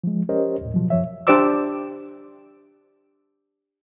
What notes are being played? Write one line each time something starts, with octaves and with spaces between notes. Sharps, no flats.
F3 G#3
C#4 G4 A#4 C5 C#5 D#5
D#2 A2
B2 F3 F#3
F#2 F3 C#5 E5
D4 G4 C5 D5 D6 E6